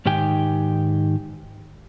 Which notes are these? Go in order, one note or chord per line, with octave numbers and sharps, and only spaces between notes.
G#2 D#3 G4 G5 G#5